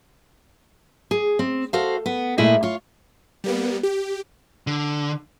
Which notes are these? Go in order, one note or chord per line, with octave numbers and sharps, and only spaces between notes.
G#4
C4
F#4 A4 C5 F5
B3
A#2 G#3 A3 E4 G#4 D#5
F4 C#5
G3 A#3 B3
G4
D3